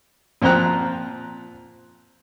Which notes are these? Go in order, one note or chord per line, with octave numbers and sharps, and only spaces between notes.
A#2 F3 C4 G5 A#5 F#6